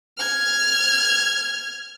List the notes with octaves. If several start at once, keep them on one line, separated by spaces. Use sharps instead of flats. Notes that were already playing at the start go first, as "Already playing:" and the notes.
F6 G#6